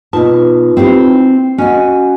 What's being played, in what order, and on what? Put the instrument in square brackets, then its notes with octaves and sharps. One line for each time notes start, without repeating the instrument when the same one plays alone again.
[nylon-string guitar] B2 A5 [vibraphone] D#4 F4 B4
[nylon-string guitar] C4 E4 G4
[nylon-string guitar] C#4 D#5 G#5 [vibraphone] F#4 F#5